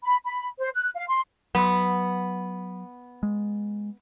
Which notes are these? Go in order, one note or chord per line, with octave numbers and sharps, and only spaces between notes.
B5
B5
C5
F#6
F5
C6
F#3 B3
G#3